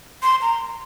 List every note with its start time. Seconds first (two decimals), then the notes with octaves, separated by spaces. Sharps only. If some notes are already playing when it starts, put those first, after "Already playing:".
0.22 C6
0.42 A#5